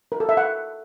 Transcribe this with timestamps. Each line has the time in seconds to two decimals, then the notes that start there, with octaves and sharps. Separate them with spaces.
0.12 A#4
0.20 A4
0.29 E5
0.37 F#5